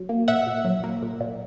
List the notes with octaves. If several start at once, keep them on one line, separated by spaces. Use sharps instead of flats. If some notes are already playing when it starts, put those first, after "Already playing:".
Already playing: F#3
A#3
A#2 E5 F#5
A#2
F#3
A#3
A#2
A#2